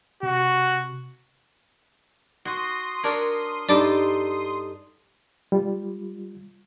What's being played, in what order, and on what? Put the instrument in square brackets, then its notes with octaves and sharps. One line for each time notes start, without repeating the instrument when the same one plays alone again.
[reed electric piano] C3 [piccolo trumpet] F#4
[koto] F#4 [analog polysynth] C6 D#6
[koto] D4 A#4 C#5
[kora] G2 [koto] D#4 A4 [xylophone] D5 D6 D7
[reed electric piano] G3 F4